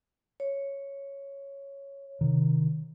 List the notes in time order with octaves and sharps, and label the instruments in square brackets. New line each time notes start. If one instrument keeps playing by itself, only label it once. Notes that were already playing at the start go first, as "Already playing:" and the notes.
[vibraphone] C#5
[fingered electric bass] C3 D#3